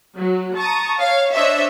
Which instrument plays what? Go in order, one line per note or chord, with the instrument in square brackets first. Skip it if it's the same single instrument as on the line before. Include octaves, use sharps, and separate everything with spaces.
[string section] F#3
A5 A#5 C#6 D#6
C#5 F5
D4 C5 C#5 D#5 E5